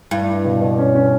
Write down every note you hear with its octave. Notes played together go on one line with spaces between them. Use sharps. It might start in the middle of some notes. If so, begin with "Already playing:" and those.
G2 E4
E4
B2
B2
C#4
C#4